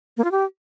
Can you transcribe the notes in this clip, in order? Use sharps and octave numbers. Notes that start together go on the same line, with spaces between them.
A#3
F4
G4